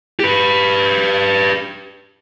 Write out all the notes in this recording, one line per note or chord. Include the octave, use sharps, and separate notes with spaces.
G4 B4